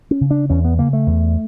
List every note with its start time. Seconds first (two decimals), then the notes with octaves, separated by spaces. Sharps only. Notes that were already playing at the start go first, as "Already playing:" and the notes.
0.11 C#4
0.21 C#3
0.31 D4
0.50 E2 C#4
0.65 B3
0.78 C#3 A#3
0.93 A3
1.07 E2